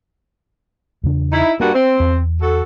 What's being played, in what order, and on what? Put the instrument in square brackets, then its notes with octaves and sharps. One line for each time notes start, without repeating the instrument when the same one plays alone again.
[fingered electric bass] E2 C#3 D4
[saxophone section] D#4 E4
[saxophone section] G2 A#3 F#4 [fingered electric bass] B3
[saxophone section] C4
[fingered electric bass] E2
[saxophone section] F#4 A4